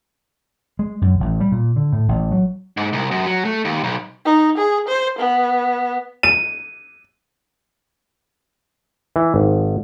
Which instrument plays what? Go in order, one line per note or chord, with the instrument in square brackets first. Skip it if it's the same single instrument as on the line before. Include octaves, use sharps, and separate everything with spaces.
[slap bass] G#3
F#2
A1
G3
A#2
D3
A2
A1
F#3
[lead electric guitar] G#2
C2
F#2
F#3
A3
D#2
B1
[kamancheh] D#4
G#4
C5
B3
[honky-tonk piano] D#7
[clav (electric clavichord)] E3
G#1